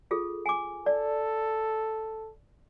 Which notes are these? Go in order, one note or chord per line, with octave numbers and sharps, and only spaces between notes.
F4 G#4 A4
G#5 D6
A4 D5